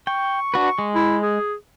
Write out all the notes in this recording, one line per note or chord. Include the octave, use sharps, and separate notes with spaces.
G5 C#6
D4 F#4 B4
G#3
E4
G#4